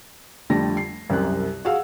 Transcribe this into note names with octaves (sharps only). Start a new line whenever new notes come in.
F2 D3 G3 A3 A4 A#6
C7
C2 F#2 C3 F#6
F#4 G#4 F5 E6